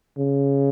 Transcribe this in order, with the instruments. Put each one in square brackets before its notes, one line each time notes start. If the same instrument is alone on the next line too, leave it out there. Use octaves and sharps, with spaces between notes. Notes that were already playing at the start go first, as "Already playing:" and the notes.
[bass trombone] C#3